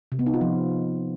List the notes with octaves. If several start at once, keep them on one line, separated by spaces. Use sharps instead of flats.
C3
B3
D#4
F4
F3